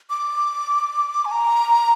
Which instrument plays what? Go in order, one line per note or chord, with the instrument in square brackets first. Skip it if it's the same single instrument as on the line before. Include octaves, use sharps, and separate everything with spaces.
[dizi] D6
G#5
A#5